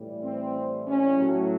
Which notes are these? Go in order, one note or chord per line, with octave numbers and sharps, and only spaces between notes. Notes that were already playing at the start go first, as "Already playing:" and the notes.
Already playing: A2 E3 G3
C4
C#4
A2 F#3